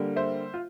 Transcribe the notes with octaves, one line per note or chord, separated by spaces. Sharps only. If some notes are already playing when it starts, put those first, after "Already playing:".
Already playing: D3 G3 A#3
C5 E5
F4